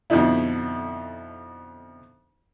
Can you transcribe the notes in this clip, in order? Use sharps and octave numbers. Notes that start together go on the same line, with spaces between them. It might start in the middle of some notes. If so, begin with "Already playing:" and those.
F2 B2 D3 D#4 E4